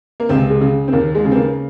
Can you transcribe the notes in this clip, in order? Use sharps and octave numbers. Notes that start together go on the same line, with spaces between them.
A#3
C#2 C3 C4
G#3
C#3
C4
D#2 A#3
G#3
C#3
C4
A#3